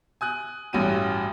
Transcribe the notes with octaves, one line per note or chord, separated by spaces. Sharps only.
G#5 D#6 F#6
A1 G2 C#4 F#4 D#7